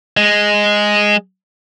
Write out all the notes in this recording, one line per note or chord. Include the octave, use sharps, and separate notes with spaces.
G#3